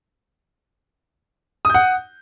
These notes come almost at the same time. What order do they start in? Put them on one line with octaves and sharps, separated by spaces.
D#6 G6 F#5